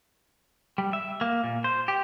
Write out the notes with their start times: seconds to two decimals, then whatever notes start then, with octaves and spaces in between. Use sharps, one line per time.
0.78 G3
0.93 E5
1.21 A#3
1.44 A#2
1.64 C5
1.88 G4